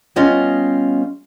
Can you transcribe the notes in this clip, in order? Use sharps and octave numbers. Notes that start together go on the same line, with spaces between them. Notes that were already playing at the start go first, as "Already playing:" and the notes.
G3 B3 C#4 F4 D#5 F5